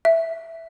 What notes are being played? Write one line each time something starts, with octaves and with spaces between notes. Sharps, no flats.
E5